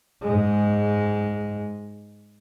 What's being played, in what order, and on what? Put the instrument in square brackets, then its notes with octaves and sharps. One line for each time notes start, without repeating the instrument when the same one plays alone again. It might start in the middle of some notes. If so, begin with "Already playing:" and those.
[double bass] G#2 G#3